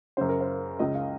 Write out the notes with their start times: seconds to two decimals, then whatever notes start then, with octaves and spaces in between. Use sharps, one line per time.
0.17 F#2 C#3 C5
0.29 A#4
0.41 C5
0.79 C#2 C#3 D#5
0.95 F5